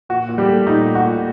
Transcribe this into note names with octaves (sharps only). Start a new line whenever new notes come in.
A#2 F#4
A#2
G3 G4
A3
A#2 D#4
A#2
F#4
A#2